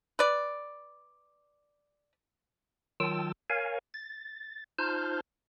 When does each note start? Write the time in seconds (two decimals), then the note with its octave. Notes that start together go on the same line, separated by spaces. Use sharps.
0.19 B4 D5
3.00 D#3 F#3 F4 G5 A5 E6
3.50 A#4 C#5 F5 G#5
3.94 A6
4.79 D#4 F4 C5 A5 F6 G6